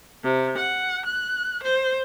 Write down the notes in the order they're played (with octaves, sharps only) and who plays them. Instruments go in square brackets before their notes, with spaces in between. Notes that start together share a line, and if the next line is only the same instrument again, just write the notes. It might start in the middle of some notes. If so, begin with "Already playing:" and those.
[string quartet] C3
F#5
F#6
C5